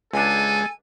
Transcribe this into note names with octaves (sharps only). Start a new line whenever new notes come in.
C#2 G#3 D4 A4 G#5